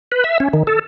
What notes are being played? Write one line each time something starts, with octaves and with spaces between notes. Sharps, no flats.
B4
E5
C#4
D#3
A4